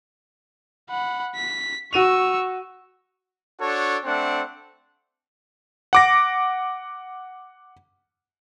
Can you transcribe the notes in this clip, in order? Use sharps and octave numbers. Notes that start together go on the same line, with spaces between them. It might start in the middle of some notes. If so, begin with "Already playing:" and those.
F#5 B5
B6
F#4 C#6 E6 D#7 F7
D4 F#4 A4 C#5
A3 C4 D4 F#5
F#5 D6 A#6